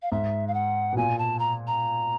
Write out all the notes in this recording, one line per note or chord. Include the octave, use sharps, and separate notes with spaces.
F5
G#2 E5
F5
F#5
B2
A#2 G#5
A5
A#5
A#5